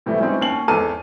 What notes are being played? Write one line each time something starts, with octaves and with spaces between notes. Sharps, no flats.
A2 C3 E3 G3 A3
E3 G3 G#3 C4 C#4 D#4
D#2 C#4 C7 F#7
G#1 E2 A4 A5 F6 D#7